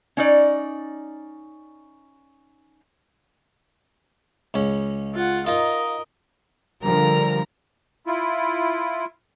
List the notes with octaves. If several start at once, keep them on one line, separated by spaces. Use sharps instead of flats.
C#4 D#4 D5
C#2 C#4
F4 F#5
D#4 F4 A#4 D#5
D3 F3 G3 A#4 A#5
E4 F4